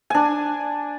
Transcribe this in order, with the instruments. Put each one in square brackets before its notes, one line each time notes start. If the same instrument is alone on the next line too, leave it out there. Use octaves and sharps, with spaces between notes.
[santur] D4 G#5